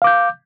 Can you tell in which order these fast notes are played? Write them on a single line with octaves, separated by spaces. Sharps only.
F5 D6 G6